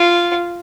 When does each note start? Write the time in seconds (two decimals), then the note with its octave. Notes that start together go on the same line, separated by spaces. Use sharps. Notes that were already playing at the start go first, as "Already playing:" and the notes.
Already playing: F4